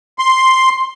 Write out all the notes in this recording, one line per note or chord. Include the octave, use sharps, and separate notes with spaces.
C6